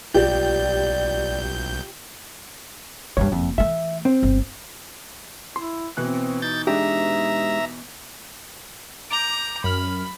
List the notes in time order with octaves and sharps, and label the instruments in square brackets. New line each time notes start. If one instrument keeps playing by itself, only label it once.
[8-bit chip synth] B1 G6 [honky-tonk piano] F4 G4 [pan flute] D5
[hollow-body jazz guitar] G2 C#3 C#5 [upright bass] G3 G#3
[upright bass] F#1 [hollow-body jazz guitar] F2
[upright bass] E3 A3 [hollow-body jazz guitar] E5
[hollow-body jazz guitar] C4
[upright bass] G1
[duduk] E4 [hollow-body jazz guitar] C6
[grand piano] B2 E3 F#6 [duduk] C4
[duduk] D#4 [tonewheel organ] G6 A6
[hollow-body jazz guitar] G#3 D4 G4 [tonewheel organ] E5 A#5
[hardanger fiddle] A#5 [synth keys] D6 G6
[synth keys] F#2 F6 [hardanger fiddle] B5